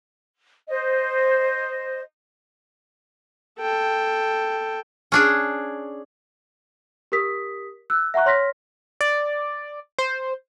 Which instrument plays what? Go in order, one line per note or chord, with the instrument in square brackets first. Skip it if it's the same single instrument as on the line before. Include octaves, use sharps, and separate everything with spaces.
[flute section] C5 D#5
[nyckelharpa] A4 G5
[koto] C#4 D4 G#4
[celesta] G4 A#4 D#6 B6
E6 F#6
E5 F#5 A#5 C#6 F#6
C#5 C6 F6 A#6 B6
[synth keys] D5
C5